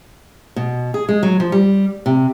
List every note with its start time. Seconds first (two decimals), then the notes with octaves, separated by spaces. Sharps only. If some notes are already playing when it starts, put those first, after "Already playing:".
0.56 B2
0.94 G#4
1.09 G#3
1.23 F#3
1.40 F3
1.52 G3
2.06 C3